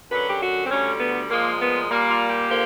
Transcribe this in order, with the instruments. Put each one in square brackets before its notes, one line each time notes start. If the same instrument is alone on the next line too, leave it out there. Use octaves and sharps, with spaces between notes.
[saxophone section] F#2 D3 F#3 B4
G4
F#4
C4
D2 D3 G3 C#4
B3
A#2 F3 G#3 A#3
B3
A#2 G3 A#3
F4
G4
D3 F3 A#3